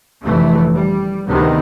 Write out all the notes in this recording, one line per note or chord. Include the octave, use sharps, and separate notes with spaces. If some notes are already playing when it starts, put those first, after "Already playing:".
F1 F2 D3 E3 A3
G3
D2 C3 D#3 B3